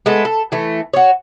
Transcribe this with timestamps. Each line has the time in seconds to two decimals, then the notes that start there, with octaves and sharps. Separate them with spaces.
0.06 G#3 A3 B3 A4
0.25 A4
0.52 E3 A3
0.93 F#4 C#5